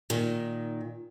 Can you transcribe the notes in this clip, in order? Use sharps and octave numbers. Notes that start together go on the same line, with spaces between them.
A#2 D#3